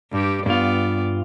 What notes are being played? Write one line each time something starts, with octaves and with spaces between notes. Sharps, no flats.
G2 G4
G2 B3 F4 D5